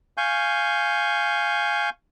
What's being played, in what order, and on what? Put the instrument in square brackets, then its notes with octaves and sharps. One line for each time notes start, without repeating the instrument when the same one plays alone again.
[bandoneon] F5 G#5 C#6 G6